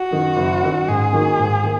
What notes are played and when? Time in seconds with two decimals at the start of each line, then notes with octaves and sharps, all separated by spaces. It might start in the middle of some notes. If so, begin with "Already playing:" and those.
Already playing: F#4
0.11 F#2 D#3
0.36 F#1
0.62 F#2 D#3
0.88 G#2 G#4
1.12 D#3 A#3 D#4 F#4
1.38 G#2
1.64 D#3 A#3